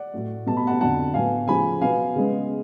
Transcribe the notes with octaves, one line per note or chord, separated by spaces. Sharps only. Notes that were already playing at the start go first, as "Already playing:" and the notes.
Already playing: D5 F#5
A2 F#3 A3
B2 A3 A5
B5
F#5 A5
F2 D3 F#3 F#5 A5
A2 F#3 B3 F5 G#5
C#3 F3 A3 G#5 B5
B2 F#3 B3 F5 G#5
C#3 G#3 B3